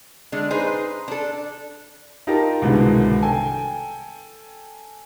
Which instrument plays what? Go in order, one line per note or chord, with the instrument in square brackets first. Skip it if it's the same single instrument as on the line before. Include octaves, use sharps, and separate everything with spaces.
[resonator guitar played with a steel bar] D3 G#3 D4
D#4 G#4 B4 C5
D4 A4
[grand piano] D#4 F4 G4 A#4 A5
C2 G#2 B2 D3 D#3 G#3
A4 G5 G#5